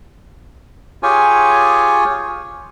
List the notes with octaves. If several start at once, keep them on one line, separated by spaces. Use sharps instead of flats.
F4 G4 G#4 C#5 G#5